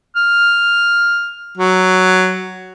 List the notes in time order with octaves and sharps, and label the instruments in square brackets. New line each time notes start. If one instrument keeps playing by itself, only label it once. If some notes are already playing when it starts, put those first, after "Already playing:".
[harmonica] F6
F#3